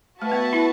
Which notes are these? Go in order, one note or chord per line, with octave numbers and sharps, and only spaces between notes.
A3 F#4 B4 E5 A5
B3
E4